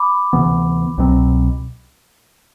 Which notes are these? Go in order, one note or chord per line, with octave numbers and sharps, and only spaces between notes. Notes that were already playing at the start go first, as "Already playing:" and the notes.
Already playing: B5 D6
D2 C3 E3 B3
C2 B2 F#3 C4